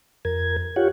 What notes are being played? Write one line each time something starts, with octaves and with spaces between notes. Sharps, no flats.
F2 A#4 G#6
F4 G4 C#5 F#5